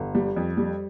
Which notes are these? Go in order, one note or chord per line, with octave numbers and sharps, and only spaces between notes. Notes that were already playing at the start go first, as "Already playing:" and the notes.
Already playing: G1
G3
F2
G3